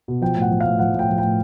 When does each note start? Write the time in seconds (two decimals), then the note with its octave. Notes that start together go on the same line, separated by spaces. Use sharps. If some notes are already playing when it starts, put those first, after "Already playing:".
0.08 B2
0.21 F3 G5
0.36 A2
0.42 F#5
0.51 F3
0.61 A2 F5
0.79 F3 F#5
0.94 A2 G5
1.09 F3
1.18 A2 G5